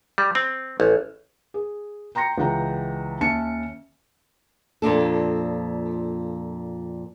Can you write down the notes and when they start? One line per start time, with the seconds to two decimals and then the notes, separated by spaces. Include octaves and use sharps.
0.18 G3
0.35 C4
0.80 A1
1.54 G#4
2.15 G5 A#5 C6 A#6 C#7
2.38 C#2 E3 G#3 F#5 G5 A#5
3.21 D#2 C#4 E5 A5 C#7
4.82 F2 A#2 D4 A4